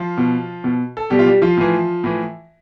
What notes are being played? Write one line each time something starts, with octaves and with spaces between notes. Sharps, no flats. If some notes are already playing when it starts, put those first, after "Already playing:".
Already playing: F3 F4
B2
B2
A4
B2 G3 G4
F4
G3 G4
F3 F4
A2 E3
A2 E3